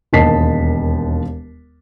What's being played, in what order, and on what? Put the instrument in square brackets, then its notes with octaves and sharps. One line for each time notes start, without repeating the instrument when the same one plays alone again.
[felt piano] E1 D#2 D#5 A5 B6 C7